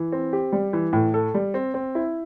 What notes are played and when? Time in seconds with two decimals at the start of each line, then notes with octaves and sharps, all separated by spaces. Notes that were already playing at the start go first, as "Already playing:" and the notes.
Already playing: E3
0.12 C4
0.33 G4
0.52 G3
0.73 E3
0.93 A2
1.14 A4
1.34 G3
1.54 C4
1.74 C4
1.95 E4